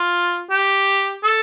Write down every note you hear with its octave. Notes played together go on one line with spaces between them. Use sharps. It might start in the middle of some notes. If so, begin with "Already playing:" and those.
Already playing: F4
G4
A4